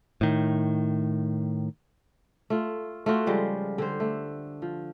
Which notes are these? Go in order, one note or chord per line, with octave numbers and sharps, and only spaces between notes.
A2 D#3
A3 F4
A3 F4 F#4 G5
C#3 F3 G3 G#3
D3 G4 C5
A3
F3